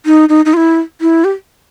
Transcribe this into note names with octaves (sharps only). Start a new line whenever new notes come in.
D#4
D#4
D#4
F4
E4
E4
G4